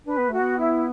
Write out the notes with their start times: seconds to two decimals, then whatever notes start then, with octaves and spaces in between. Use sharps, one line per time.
0.07 D4 B4
0.18 B3
0.29 A3 F#4
0.41 B3
0.59 E4